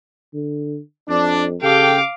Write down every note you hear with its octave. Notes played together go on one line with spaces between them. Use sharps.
D3
F2 D4
C#3 G4 A4 F5 G5 D6